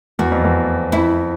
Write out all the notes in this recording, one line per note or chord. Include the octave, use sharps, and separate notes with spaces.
E2 F#4
F2
E2
F2 E4